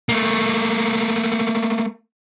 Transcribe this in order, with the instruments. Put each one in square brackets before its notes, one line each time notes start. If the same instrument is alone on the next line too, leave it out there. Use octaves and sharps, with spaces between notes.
[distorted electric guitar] A3 A#3